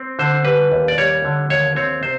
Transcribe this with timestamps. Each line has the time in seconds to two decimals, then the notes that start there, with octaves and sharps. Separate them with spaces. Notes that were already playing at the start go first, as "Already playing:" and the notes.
Already playing: C4
0.19 D3 C5
0.45 G3 B4
0.72 D#2
0.88 D5
0.98 G3 C#5
1.25 D3
1.50 D#2 C#5
1.76 C4 C#5
2.03 C3 C5